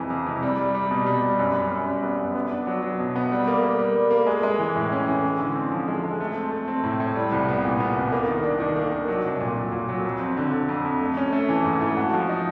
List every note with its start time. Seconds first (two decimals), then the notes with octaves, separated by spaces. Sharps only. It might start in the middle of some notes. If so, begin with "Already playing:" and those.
Already playing: F2 C3 E3 G#3
0.10 F2
0.26 C3
0.43 G3
0.58 G3
0.75 G3
0.91 B2
1.06 G3
1.22 G3
1.39 F#2
1.55 F#2
1.71 F#2
1.87 G3
2.03 B3
2.19 F#2
2.35 B3
2.50 D4
2.67 F#3
2.83 F#3
2.99 B2
3.16 B3
3.32 G3
3.47 A#3
3.63 A#3
3.79 G3
3.96 G3
4.11 A#3
4.27 G#3
4.43 G#3
4.59 E3
4.76 A2
4.92 C#4
5.07 E3
5.23 G#3
5.39 D3
5.55 C4
5.72 F3
5.88 G#3
6.03 G#3
6.20 A3
6.36 C4
6.52 A3
6.68 C4
6.84 A2
7.00 A2
7.16 G3
7.32 C2
7.48 B3
7.64 A#2
7.80 B3
7.96 C2
8.12 A#3
8.28 D#3
8.44 D4
8.60 D#3
8.76 A#3
8.92 D4
9.08 F#3
9.24 C2
9.41 A#2
9.57 F#3
9.72 A#2
9.89 F#3
10.05 F2
10.20 C4
10.37 D3
10.52 D3
10.69 F2
10.85 F2
11.01 A3
11.17 C#4
11.32 A3
11.49 E3
11.65 G#2
11.81 A3
11.97 F#4
12.14 F3
12.29 D#4